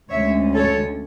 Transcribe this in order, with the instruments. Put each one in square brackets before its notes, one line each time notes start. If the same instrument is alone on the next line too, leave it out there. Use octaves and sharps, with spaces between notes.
[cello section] D2 D3 G#3 C#4 C#5 E5
A4 C#5